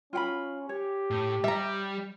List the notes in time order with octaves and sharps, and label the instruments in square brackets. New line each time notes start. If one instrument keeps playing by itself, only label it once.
[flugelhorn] C#4 [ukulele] F4 G5 B5
[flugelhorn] G4 [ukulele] C#5
[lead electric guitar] A2
[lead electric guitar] G3 [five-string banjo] E5 A#5